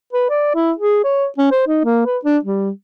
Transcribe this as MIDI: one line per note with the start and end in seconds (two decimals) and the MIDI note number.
0.13 0.27 71
0.30 0.51 74
0.55 0.72 64
0.78 1.01 68
1.04 1.26 73
1.38 1.48 61
1.52 1.67 72
1.67 1.80 63
1.84 2.03 58
2.06 2.18 71
2.25 2.38 62
2.45 2.70 55